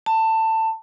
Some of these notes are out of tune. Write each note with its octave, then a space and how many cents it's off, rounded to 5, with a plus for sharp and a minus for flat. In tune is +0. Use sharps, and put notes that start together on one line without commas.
A5 +20